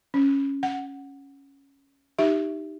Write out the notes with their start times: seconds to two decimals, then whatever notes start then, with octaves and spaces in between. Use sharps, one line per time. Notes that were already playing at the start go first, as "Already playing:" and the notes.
0.14 C#4
0.63 F#5
2.19 D#4 G4 E5